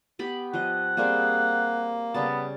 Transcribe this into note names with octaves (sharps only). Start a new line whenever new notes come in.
B3 G4 B5
F3 D#5 F#5
G3 A#3 C4 G#4
C#3 G3 B3 A5